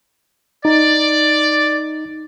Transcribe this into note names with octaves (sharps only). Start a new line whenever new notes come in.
D#4 D5